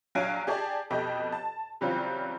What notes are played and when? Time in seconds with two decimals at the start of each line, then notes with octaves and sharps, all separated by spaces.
0.15 A#1 F#3 F5 G#5 D7
0.47 G4 G#4 D5 A5
0.90 F2 B2 G4 A4 D#5
1.32 A5
1.81 C#3 E3 F#3 G3 C4 F4